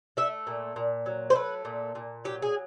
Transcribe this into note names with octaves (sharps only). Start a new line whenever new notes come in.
A3 E5
A#2
A#2
F#3
C5
A3 B4
A#2
A#2
F#3 G4
G#4